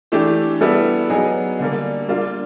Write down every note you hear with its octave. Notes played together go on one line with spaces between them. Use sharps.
E3 A3 D4 G4
G3 B3 E4 A4
F#3 B3 D#4 G#4
D3 G3 A#3
G3 A#3 D4 F4